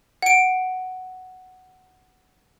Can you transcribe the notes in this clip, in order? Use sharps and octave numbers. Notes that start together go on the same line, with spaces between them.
F#5 D7